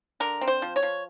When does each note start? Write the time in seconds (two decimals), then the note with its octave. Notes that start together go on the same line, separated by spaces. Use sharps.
0.20 D3 A#4
0.41 C4
0.48 C5
0.62 F3
0.76 C#5
0.83 F3